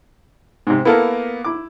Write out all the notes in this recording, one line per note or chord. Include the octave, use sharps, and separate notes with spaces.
G#2 C3
A#3 B3 E4 A4 A#4
E4 D6